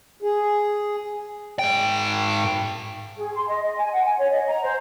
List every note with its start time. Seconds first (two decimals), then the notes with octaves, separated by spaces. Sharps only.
0.22 G#4
1.59 G#2 G5
3.17 G#4
3.34 C6
3.48 D#5
3.63 D#5
3.77 G#5
3.93 F#5
4.05 G#5
4.19 C#5
4.31 D#5
4.48 A#5
4.63 C5